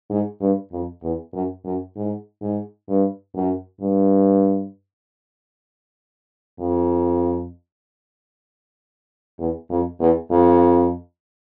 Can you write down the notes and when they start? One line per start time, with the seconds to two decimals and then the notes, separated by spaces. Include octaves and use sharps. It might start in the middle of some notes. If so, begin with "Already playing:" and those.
0.10 G#2
0.41 G2
0.72 F2
1.03 E2
1.33 F#2
1.65 F#2
1.96 G#2
2.41 G#2
2.89 G2
3.35 F#2
3.81 G2
6.59 F2
9.39 E2
9.70 F2
10.00 E2
10.31 F2